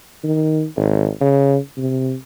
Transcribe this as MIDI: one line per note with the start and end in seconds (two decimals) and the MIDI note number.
0.24 0.65 51
0.77 1.10 32
1.21 1.58 49
1.77 2.15 48